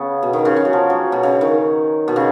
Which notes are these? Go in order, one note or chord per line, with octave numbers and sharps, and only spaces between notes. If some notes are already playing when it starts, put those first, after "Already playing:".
Already playing: C#3 B3
B2
D#3
C#3
C#3
F#3
F3
F#3
B2
C#3
D#3
B2
C#3